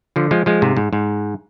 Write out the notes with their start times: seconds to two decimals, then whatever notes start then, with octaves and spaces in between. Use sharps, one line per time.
0.16 D3 F3
0.31 F3 G#3
0.46 F3 G#3
0.62 G#2 C3
0.77 G#2
0.93 G#2